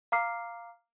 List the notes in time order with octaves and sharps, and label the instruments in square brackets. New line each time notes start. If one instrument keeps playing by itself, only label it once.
[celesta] F5 A#5 D6 F6 C7